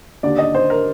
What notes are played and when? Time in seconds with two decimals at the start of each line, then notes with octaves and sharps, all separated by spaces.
0.23 D#2 D3 D5
0.39 D#5
0.55 C5
0.70 A#4